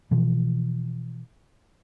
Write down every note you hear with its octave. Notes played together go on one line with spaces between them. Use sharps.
B2 E3 F3